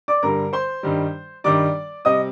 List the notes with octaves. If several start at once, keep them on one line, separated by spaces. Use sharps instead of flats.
D5 D6
G2 D3 G3 A#4 A#5
C5 C6
G2 D#3 G3
G2 D#3 G3 D5 D6
C3 G3 D#5 D#6